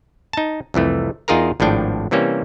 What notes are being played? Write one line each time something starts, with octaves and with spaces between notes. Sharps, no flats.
D#4 A5
C2 F2 E3 A3
E2 D#4 F4 G#4 A#4 A#5
G#1 A2 F3 D4 G5
C3 E3 G3 A#3 C#4